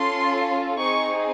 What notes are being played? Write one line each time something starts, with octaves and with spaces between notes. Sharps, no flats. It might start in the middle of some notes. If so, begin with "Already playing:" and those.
Already playing: C#4 F4 A4 C6
C4 D#4 G#4 C#6